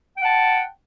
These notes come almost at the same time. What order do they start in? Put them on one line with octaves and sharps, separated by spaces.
G5 F#5 A5